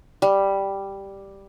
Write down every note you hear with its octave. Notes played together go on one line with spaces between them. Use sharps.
G3